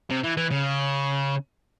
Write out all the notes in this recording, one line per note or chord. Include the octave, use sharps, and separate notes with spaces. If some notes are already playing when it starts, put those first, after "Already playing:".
C3
E3
E3
C#3